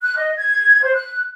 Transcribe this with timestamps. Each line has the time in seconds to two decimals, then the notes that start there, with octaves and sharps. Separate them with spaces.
0.02 F#6
0.16 D#5
0.36 G#6
0.83 C5
0.94 F#6